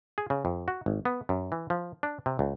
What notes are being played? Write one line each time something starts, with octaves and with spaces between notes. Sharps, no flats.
G#4
C#3
F2
F#4
G#1
B3
F#2
E3
F3
D4
C3
C#2